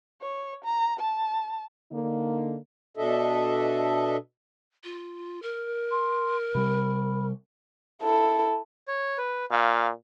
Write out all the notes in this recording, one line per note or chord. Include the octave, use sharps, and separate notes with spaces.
C#5
A#5
A5
D3 A#3 D#4
B2 D4 A4 D#5 E5
F4
A#4
C6
C3 G3 B5
E4 A4
C#5
B4
A#2 F5